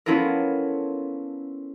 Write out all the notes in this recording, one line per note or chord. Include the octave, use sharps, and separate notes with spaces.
B3 C#4 E4 F4 A4 A#4